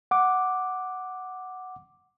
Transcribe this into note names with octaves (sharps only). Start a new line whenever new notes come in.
F#5 D6